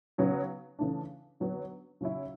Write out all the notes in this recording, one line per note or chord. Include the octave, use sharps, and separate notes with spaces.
C#3 F#3 B3
C#3 E3 A3 D4
D3 F#3 B3
C#3 F#3 C#4 E4